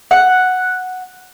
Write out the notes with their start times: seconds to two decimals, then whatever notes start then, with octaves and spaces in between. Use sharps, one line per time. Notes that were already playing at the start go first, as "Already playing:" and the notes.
0.11 F#5